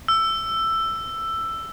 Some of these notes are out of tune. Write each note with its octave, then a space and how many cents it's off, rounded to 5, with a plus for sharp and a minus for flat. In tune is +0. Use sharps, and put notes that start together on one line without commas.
E6 +10